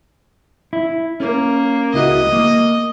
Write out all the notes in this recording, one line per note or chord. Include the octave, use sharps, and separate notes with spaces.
E4
A#3 C#4
C#2 E4 F#4 D#5
A#3